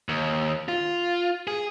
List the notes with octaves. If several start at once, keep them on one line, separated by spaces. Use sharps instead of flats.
D#2
F4
G#4